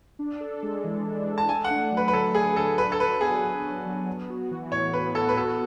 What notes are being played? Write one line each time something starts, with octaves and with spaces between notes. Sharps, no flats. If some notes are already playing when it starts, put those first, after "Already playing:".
D4
A4
G#3
E3
D4
A4
A5
A3 G#5
F#5
D4
F#3
B4
B4
D3 A4
A3 G#4
D4 A4
F#4 B4
A4
F#3 B4
B3 G#4
F#3
F#4
F#3
B3
F#4
E3
A2 C#5
B3 B4
F#4 A4
B4
B3 A4